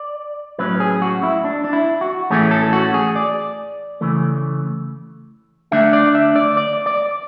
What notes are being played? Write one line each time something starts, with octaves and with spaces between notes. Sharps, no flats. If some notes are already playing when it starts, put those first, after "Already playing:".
Already playing: D5
A2 F#3 C#4 B4
G#4
F#4
E4
D4
D4
E4
F#4
A2 E3 A3 C#4 G#4
A4
F#4
G#4
D5
C#3 E3 A3
D3 A3 D4 E5
D5
E5
D5
D5
D5